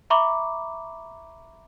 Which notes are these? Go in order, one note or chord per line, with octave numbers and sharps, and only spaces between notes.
E5 A#5 B5 C#6 D6